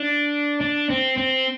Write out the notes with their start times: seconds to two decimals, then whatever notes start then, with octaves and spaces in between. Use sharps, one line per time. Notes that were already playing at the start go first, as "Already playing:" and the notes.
Already playing: D4
0.61 D4
0.90 C4
1.17 C4